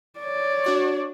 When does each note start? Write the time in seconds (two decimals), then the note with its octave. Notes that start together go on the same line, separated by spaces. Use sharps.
0.20 C#5 D5
0.64 D4 F#4 D6